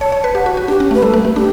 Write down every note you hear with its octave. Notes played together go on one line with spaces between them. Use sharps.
C#5 A5
C#5
B4
G4 F#5
F#4
F#4
D4 G4
C#4
A3
B4
G3 A4
A3
A3
D4 G4